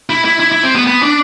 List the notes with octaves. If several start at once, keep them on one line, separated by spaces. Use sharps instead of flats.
E4
E4
E4
E4
C4
B3
B3
D4